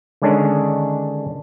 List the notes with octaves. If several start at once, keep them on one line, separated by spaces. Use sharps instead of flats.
D3 D#3 G#3 C#4 D4